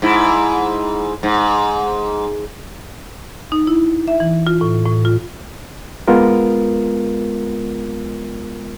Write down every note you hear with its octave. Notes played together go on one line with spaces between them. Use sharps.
G#2 E4
G#2
D#4
E4
E5
E3
F4
A2
A2
F4
G#3 B3 F4 A#4